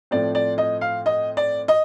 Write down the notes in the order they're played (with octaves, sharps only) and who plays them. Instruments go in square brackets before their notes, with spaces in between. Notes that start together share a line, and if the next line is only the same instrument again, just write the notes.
[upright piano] A2 F3 A3 C4 D5
D5
D#5
F5
D#5
D5
D#5